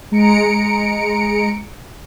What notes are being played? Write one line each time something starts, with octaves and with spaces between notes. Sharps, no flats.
G#3 A#5 C#7 D7